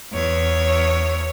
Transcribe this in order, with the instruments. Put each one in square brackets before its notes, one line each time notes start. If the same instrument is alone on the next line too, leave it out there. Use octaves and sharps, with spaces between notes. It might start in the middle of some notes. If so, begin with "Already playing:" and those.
[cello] E2 C#5